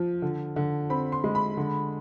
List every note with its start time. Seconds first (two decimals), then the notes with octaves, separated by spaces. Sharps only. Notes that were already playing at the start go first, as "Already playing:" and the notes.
Already playing: F3
0.22 D3
0.56 D3
0.90 C4 B5
1.12 C6
1.24 G#3
1.35 B5
1.57 D3